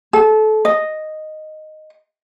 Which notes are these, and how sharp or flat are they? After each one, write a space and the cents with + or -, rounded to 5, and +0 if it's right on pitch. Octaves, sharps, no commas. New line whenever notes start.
A4 -25
D#5 -5